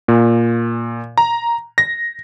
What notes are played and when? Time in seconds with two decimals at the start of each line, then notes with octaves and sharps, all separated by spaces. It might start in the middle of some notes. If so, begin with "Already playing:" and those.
0.08 A#2
1.18 A#5
1.78 A#6